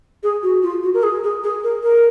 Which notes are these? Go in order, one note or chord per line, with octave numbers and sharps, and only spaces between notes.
G#4
F#4
F4
F#4
A#4
G#4
G#4
G#4
A#4
A#4